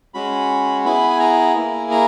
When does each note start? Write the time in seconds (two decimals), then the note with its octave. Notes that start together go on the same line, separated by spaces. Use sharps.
0.14 G#3 C#4 F#4 B5
0.85 B3 E4 G#4 B5
1.10 G#5
1.20 A#5
1.55 A#3 E4 G#4
1.91 A#5